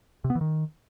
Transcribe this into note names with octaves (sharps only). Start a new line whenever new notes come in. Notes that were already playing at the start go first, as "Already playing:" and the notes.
C3
B3
E3
D#3